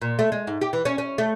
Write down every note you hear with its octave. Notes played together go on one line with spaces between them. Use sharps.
A#2
A3
G#3
G#2
G4
E3
C#4
C#4
A3